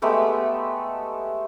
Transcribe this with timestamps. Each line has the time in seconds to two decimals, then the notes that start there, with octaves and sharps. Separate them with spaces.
0.02 G#3 A3 B3 G4